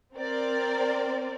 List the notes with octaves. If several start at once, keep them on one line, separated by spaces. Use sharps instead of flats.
C4 A#4 D5